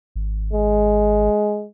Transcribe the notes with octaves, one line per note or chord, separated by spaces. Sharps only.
G#1
G#3